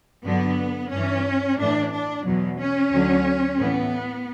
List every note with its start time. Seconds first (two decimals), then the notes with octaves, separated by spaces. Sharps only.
0.24 G2 D3 F#3 B3
0.92 G2 E3 C#4
1.58 A2 E3 D4
1.92 D4
2.25 E2 B2 F#3
2.59 C#4
2.92 D2 D3 F#3
3.58 A2 E3 B3